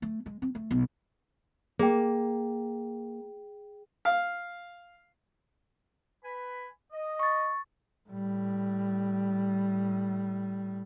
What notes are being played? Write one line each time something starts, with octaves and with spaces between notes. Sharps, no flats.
A3
G#3
C4
A3
B1
A#3 G#4 G5
F5
B4 G#5 B5
D#5
C#6 A6
A2 G3